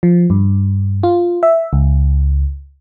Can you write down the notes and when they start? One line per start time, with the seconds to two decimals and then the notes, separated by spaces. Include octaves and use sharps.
0.03 F3
0.30 G2
1.03 F4
1.43 E5
1.73 C#2